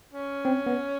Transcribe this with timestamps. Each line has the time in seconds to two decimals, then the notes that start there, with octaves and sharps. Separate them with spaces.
0.13 C#4
0.45 C4
0.66 B3